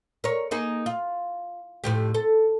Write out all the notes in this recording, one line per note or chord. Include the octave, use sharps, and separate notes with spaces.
A#4 C#5
A#3 D#4 G#4
F4
F2 A2 G4
A4